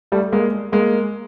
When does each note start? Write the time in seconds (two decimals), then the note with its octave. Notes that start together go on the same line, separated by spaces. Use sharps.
0.12 G3 A3
0.32 G#3 A#3
0.72 G#3 A#3